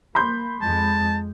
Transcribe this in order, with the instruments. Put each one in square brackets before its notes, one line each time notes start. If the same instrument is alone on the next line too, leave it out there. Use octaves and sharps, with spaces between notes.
[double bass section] A#3 [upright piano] B5 C6 G6
[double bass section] F2 G#3 [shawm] A5